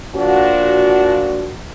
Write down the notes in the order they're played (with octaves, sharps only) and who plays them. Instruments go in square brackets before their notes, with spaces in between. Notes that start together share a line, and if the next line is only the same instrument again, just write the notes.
[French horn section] A#2 F3 D4 F#4